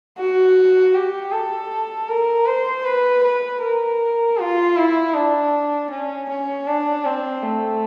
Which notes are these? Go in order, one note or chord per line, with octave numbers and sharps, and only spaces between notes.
F#4
G4
A4
A#4
C5
B4
B4
A#4
F4
E4
D4
C#4
C#4
D4
C4
A3